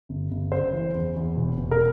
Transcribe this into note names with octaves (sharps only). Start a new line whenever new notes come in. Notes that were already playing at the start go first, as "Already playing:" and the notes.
G1
G1
F#1 C5
E3
E2
E2
E1
E1
A#4